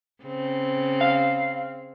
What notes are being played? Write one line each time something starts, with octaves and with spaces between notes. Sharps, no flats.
C#3 C4
F5